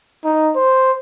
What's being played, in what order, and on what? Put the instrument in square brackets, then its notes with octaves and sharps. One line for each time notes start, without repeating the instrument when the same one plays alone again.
[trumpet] D#4
C5